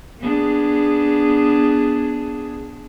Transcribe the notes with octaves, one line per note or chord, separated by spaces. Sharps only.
B3 D4 G#4